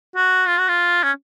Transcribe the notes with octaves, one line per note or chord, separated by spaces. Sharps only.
F#4
F4
F#4
F4
C#4